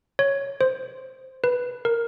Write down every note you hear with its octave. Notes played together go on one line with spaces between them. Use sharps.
C#5
C5
B4
A#4